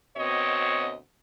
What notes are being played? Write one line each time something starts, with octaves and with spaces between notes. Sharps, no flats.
D2 B2 C4 C#5 D#5